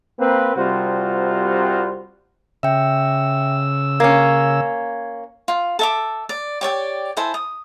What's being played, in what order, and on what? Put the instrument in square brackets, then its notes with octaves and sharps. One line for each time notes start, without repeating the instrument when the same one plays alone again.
[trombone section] A#3 C4 B4
C2 C3 G3 F4 F#4 C5
[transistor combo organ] C#3 E6 [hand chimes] E5 G5
[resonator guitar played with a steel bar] A#3 C#4 [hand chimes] G#6
[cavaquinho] F4
A4 E5 D6
D5
G4 C#5 D5 G5
E4 A4 C5 G#5
D#6